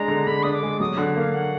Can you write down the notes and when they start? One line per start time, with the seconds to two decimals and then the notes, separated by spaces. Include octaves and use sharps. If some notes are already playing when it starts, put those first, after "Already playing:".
Already playing: G#3 D4 A#5
0.08 D3
0.27 D3 B5
0.43 D4 D#6
0.54 D6
0.63 G#3
0.80 F#3 D#6
0.98 D3 F#5
1.16 A#3 F5
1.34 F#5